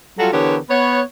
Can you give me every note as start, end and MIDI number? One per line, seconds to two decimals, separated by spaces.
0.18 0.28 54
0.18 0.28 55
0.18 0.28 65
0.18 0.28 66
0.18 0.28 69
0.32 0.55 50
0.32 0.55 52
0.32 0.55 59
0.32 0.55 67
0.32 0.55 70
0.32 0.55 73
0.69 0.99 59
0.69 0.99 73